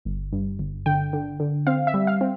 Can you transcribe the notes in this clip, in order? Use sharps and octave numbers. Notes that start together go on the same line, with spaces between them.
G1
G2
G1
D3 G5
D3
D3
C4 F5
E5
G3
F5
C4